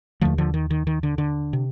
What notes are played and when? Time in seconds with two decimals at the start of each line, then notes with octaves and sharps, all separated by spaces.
0.21 D#2 D3 F3 A3
0.38 D3 F3
0.54 D#3
0.71 D#3
0.87 D#3
1.03 D3
1.18 D3
1.53 C3